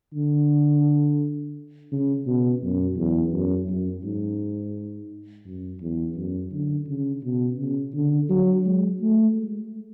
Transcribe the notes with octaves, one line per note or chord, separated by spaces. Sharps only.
D3
C#3
B2
F#2
E2
F#2
F#2
G#2
F#2
E2
F#2
D3
C#3
B2
C#3
D3
F#3
G#3
A3
G#3